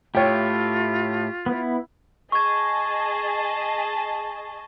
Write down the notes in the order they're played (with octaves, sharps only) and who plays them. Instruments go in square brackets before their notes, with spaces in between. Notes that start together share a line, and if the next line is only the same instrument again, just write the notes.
[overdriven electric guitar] A2 [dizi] F4 [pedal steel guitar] G4 [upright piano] C#5 G5
[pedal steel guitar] B3 E4
[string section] G#4 D#5 A5 [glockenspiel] C#6 G#6